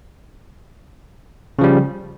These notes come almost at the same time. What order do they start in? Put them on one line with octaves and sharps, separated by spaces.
C#3 F3 G3